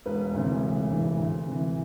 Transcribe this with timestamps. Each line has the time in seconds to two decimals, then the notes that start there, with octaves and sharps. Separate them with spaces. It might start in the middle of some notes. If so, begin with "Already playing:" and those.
0.06 E1 B4
0.34 D2 C3 E3
0.63 E1
0.91 D2 C3 E3
1.19 D2
1.47 C3 E3